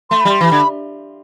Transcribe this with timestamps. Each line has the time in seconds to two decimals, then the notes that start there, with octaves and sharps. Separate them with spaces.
0.10 A3 C6
0.21 G3 B5
0.30 C6
0.41 E3 B5
0.51 D3